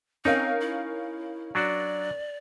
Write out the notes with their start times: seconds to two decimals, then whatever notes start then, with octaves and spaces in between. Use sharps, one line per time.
0.25 C4 C#4 D#4 A#4 F5
0.61 E4
1.55 F#3 D4 F#4 D5